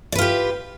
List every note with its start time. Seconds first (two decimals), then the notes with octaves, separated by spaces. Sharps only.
0.12 D5
0.15 B4
0.19 F4
0.22 G4